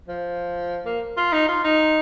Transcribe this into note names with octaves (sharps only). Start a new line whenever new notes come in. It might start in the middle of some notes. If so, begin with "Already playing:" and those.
F3
A#3
F4
D#4
F4
D#4